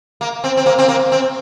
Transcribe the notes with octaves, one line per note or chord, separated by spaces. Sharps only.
A#3
C4
C4
A#3
C4
A#3
C4